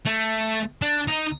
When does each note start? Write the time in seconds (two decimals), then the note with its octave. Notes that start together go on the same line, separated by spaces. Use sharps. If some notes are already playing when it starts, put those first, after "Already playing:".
0.06 A3
0.82 D4
1.08 D#4